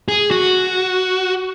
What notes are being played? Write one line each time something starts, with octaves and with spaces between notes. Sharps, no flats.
G#4
F#4